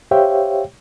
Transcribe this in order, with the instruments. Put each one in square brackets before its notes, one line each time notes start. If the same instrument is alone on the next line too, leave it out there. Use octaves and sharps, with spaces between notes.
[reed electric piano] G4 C5 C#5 E5 F5 G5